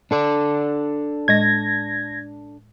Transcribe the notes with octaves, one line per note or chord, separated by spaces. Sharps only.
D4 A4 D5
A2 G#3 D#5 G#6 A#6